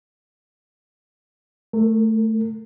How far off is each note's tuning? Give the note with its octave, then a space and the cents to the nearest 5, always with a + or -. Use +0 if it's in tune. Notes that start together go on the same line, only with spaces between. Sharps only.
A3 +0 A#4 -30